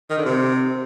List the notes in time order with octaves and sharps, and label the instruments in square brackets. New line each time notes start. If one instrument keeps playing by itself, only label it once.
[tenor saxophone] D#3
D3
C3